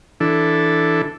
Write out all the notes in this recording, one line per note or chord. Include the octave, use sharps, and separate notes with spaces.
E3 D4 A4